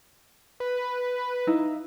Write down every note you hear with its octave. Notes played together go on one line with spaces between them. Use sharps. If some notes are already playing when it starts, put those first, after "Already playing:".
B4
D#4 E4 F5